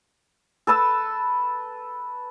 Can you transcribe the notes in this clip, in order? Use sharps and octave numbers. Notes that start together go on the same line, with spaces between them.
A4 B4 A5 E6